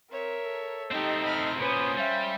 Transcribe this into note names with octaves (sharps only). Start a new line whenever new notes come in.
C4 A#4 C#5 E5
A4
A3 C4 D#4 G4 D#5
B5 F6
A#2 B3 C#4 B4 C5 D#6
G3 E5 F5